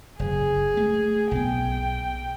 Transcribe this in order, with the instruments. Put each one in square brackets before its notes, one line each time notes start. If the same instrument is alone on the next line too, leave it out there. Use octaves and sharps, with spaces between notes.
[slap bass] F#1 [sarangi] G#4
[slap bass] A3
[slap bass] B1 B3 [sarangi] G5